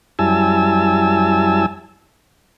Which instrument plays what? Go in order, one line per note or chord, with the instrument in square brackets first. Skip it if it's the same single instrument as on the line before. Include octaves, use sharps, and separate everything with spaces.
[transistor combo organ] F#2 G3 E4 G#5 A5 E6